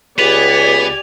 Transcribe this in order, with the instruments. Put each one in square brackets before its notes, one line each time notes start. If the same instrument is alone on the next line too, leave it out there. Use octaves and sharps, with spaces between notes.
[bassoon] C#2 [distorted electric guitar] B3 [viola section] G4 D5 G#5 [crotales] F7